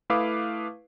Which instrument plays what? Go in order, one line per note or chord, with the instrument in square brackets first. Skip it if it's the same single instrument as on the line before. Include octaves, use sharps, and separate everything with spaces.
[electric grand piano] A3 E4 B4 F5 D6 D#6